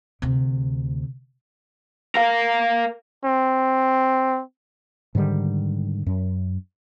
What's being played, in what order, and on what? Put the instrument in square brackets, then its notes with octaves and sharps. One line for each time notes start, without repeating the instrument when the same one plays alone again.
[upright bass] D2 C3
[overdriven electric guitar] A#4 F5
[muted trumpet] C4
[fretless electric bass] G#2 D3 D#3 G3
F#2